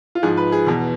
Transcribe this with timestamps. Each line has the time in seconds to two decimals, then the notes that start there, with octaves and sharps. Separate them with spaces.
0.15 F4
0.23 G#2 F3 G#4
0.37 B4
0.52 G#4
0.67 E2 B2